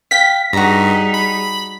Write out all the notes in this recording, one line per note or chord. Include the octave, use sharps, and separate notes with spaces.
F5 G5 B6
G2 G3 D#4 F#4 G#4 A#5
B5